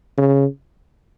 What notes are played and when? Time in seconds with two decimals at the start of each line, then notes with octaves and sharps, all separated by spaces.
0.18 C#3